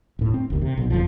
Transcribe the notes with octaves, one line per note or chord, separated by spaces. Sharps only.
D#1 A2
C4
F#1 D#2
C3
B1 B2
F#1 F2 F3